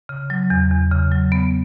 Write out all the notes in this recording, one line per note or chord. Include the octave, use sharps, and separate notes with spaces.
C#3
F#3
E2
E2
C#3
F#3
B3